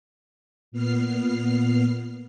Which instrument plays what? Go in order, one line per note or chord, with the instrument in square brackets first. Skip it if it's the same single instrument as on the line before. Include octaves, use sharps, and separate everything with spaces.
[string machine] A#2 B3 F6 C7